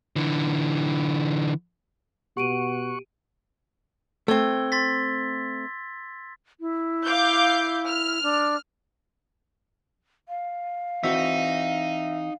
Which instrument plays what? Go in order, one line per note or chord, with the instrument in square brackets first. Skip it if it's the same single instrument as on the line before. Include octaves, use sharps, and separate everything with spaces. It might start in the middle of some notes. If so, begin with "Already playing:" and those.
[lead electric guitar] D3 E3
[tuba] B2 [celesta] G4 D7 D#7 [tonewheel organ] F#5 C#6
[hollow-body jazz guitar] A3 C4 [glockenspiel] E6 G#6 G7
[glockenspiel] C6 A6 B6
[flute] E4
[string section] F5 D6 G6
F6
[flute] D4
[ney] F5
[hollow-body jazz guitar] E3 C4 F#4 [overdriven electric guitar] D#4 [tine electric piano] E5